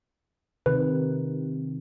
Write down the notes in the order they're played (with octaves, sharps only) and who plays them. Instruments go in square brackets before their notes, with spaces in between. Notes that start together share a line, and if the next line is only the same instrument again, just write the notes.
[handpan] C3 D#3 [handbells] B4